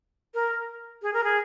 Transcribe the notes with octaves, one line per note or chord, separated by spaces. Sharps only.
A#4
G#4
A#4
G#4